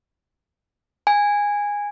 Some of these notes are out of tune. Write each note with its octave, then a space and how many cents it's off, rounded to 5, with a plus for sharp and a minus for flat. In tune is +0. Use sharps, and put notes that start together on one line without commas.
G#5 -15